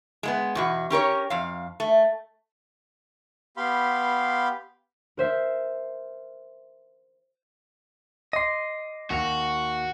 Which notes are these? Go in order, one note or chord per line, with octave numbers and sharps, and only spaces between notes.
G#3 A#3 B3
E2 B2 F#4
C#4 G4 A#4 C#5
F2 F5
A3
B3 G4 F5 B5 C6
A#4 C5 E5
D#5 C6 D6
D#2 F#4 A#6 F7